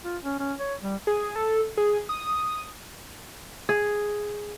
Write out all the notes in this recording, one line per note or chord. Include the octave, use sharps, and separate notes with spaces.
F4
C#4
C#4
C#5
G3
G#4
A4
G#4
D#6
G#4